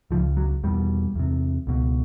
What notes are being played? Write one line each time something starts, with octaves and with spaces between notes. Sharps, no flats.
C#2 C#3 F3
F#3
E2 B2 G3
E2 C3
C#2 B2